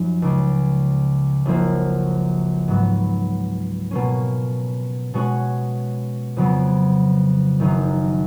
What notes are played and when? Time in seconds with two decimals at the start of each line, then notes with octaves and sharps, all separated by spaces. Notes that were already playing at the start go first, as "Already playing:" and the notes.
Already playing: F#2 F3 D#4
0.22 C#2 C#3 G#3
1.45 F#1 F#2 F3 A#3
2.68 G#2 F#3 B3
3.91 B2 A#3 C#4
5.14 B2 G#3 C#4 F#4 C#5
6.36 F2 C#3 F#3 B3
7.60 F#1 F#2 D#3 A#3 D#4